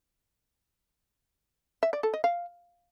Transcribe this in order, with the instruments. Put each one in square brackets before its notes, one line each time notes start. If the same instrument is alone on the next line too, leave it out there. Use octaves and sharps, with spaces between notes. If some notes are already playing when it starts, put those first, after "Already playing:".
[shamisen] E5
D5
A4
D#5
F5